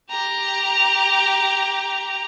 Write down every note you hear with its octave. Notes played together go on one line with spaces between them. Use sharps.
G4 A#5